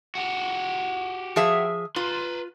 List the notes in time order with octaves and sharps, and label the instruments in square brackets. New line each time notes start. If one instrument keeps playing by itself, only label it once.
[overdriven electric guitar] F#4 G4
[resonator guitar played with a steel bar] F3 G#4 E5
[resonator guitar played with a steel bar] F4 [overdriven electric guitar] B4 C6